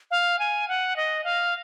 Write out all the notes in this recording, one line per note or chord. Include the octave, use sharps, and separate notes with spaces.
F5
G#5
F#5
D#5
F5